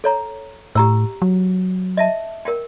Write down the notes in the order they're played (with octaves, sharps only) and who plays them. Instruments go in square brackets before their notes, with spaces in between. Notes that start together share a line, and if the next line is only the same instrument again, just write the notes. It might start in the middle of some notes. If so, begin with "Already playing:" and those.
[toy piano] A4 C#5 A#5
[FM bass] A2 [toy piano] G4 A#5 E6
[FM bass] F#3
[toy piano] D#5 E5 A5
A#4 F#5 G5